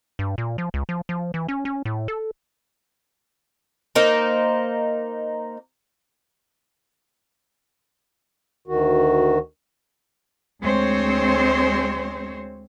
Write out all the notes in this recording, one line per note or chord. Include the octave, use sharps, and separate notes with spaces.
G2
A#2
F3
C#2
F3
F3
E3
C#4
C#4
A2
A4
A#3 D#4 C5
D2 D#3 F#4
D2 G#3 C4 C5 C#5